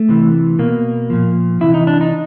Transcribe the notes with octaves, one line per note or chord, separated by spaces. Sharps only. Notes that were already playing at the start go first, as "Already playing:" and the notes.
Already playing: A3
C3 E3
B2 A#3
A#2 F3
C3 E3 E4
D#4
D4
D#4